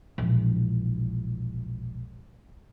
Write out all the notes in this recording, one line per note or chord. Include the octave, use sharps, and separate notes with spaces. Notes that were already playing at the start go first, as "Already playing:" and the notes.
E1 A#1